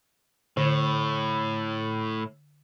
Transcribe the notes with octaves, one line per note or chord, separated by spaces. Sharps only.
A2 D3